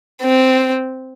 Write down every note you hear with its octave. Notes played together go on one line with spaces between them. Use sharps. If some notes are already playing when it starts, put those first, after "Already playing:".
C4